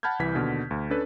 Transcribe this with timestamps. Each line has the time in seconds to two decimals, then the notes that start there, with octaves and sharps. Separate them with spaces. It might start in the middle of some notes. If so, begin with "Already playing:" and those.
0.03 F#5 A5 B5 F6 G6 G#6
0.19 C2 E3 B6
0.35 D#2 B2 D3
0.71 D2
0.90 C#4 D4 A4 B4